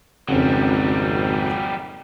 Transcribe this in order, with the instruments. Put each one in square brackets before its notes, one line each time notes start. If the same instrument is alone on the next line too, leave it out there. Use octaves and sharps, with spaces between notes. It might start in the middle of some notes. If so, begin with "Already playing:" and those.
[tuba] G#1 [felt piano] F2 C#3 [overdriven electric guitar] F#3 G3